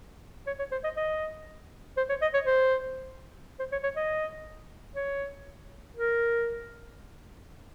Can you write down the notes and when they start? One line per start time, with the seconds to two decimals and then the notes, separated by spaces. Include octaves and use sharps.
0.47 C#5
0.59 C#5
0.72 C5
0.84 D#5
0.97 D#5
1.97 C5
2.09 C#5
2.22 D#5
2.34 C#5
2.46 C5
3.59 C5
3.72 C#5
3.83 C#5
3.96 D#5
4.96 C#5
5.96 A#4